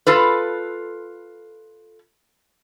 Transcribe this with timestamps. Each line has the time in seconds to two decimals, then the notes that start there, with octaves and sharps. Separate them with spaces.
0.07 F4 A4 B4